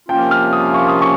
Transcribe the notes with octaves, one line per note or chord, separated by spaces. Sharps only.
C3 F3 A#3 C#4 F4 G5
F6
D#6
C#6
D#6
C#6